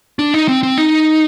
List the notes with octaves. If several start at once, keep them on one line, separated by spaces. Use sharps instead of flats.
D4
D#4
C4
C4
D#4